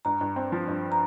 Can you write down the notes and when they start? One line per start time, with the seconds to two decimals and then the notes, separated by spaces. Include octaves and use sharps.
0.05 G2 A#5
0.21 G2
0.36 C4
0.52 F3
0.68 G2
0.92 A#5